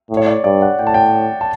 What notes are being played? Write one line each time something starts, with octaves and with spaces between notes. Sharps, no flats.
A2
C#5
D5
G2 D5
F#5
A2 G5
A5
G5
A5